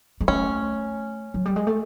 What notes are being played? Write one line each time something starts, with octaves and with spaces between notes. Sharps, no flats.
G#3
A3 C#4
F#3
G3
G#3
A3